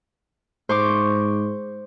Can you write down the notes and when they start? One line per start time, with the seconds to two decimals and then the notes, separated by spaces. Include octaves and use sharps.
0.69 G#2 C5 C#6 D6